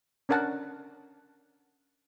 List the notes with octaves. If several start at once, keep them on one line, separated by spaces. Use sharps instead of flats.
C#4 D4 A#4 F#5 A5